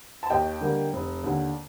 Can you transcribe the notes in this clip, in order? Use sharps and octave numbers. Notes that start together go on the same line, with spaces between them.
A5
D#2 D#5 G5
D3 G3 A#3
F1
D#2 D3